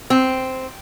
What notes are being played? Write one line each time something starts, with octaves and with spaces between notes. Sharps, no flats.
C4